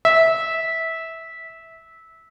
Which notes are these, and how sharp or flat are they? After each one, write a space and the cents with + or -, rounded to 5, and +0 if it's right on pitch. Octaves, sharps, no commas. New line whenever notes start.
E5 -15